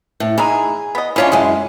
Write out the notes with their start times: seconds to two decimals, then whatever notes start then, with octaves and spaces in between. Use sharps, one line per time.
0.20 A2
0.38 E3 G#3 D#4 G#4
0.95 B3 D#5
1.16 E3 G#3 C#4 D4 F4 C#5
1.32 F#2 A2 G#3 G#4